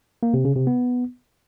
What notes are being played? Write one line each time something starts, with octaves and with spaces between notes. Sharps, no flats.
A#3
C3
C#3
C3
B3